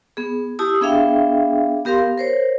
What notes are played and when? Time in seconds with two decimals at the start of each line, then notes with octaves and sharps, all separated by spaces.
0.17 B3 G#4
0.59 E4 G4 A5 D#6 E6
0.81 B3 D4 G#4 E5 F5 G5
1.85 B3 G4 A#4 F5 C6
2.18 A#4 C5 C#5